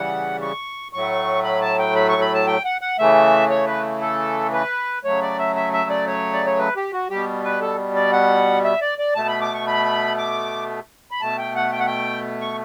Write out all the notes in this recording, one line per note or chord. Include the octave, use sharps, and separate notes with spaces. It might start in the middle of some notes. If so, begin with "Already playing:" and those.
Already playing: C#3 E3 G3 F#5
C#6
A2 F#3 A3 C#6
B5
A5
G5
B5
C#6
B5
A5
G5
F#5
F#5
C#3 E3 A3 E5
C#5
B4
A4
B4
C#3 F#3 A3 C#5
D5
E5
E5
E5
D5
C#5
D5
C#5
B4
G4
F#4
B2 G3 G4
B4
A4
D5
F#5
E5
D5
D5
B2 A3 A5
B5
D6
C#6
B5
D6
B5
B2 A3 A5
G5
F#5
G5
F#5
G5
C#6